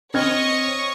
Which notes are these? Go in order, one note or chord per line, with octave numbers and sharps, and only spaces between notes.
C4 C#5 D#5 C#6 D#6 F6 G#6